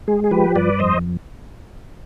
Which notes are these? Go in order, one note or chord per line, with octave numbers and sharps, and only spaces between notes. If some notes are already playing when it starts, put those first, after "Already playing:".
G#3 G#4
G#4
F3 G4 B4
G2 B4 D5
F2 C5 D#5